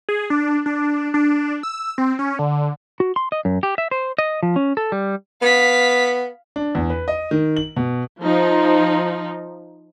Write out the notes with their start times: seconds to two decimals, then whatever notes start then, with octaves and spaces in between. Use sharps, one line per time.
0.09 G#4
0.30 D4
0.66 D4
1.14 D4
1.63 E6
1.98 C4
2.19 C#4
2.39 D3
3.00 F#4
3.16 C6
3.32 D#5
3.45 F#2
3.63 G4
3.78 E5
3.91 C5
4.18 D#5
4.43 F3
4.56 C#4
4.77 A4
4.92 G3
5.42 B3 F5 B6
6.56 D4
6.75 E2
6.90 B4
7.08 D#5
7.31 D#3
7.57 F#7
7.77 B2
8.21 F3 D#4